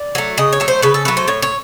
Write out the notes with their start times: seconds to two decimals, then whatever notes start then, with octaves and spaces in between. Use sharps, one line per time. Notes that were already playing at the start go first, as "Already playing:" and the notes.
Already playing: D5
0.15 F#3 A3
0.38 C#3 D#5
0.53 C#5
0.60 F#3 A3
0.68 C5
0.82 C#3 B4
0.94 A4
1.05 F#3 A3 B4
1.17 C5
1.28 A2 C#5
1.42 C#5